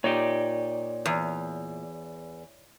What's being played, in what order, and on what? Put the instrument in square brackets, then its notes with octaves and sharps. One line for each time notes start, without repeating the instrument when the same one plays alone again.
[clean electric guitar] A#2 D#4 G4 [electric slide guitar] C#5 D5
[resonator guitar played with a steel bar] E2